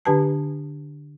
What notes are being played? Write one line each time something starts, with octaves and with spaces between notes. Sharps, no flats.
D3 D4 G4 B4 G#5 A5